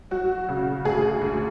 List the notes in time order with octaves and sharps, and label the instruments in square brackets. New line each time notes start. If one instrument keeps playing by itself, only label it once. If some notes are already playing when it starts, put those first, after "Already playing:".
[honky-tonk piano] F#3 F#4
C#3
D2 G#4
D2